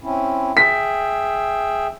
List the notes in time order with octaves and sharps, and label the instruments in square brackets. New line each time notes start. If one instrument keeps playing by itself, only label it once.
[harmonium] C4 C#4 E4
[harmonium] G#4 E5 G5 [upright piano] B6